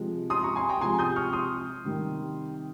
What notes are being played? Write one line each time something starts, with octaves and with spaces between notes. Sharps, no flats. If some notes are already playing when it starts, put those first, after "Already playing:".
Already playing: C3 F3 G#3
C6 D#6
A#5 C#6
G#5 C6
G5 A#5
C3 F3 G#3 G#5 C6
D#6 G6
C#6 F6
C6 D#6
C3 D#3 G3